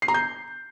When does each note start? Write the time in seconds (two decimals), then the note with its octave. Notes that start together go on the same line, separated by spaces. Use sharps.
0.02 C7
0.08 A#5
0.14 G6